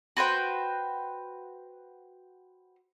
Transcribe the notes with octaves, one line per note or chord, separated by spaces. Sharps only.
F#4 B4 C5 G5